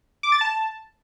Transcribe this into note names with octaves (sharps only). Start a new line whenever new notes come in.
D6
A6
A5